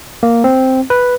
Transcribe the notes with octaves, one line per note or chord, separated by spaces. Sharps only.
A#3
C4
B4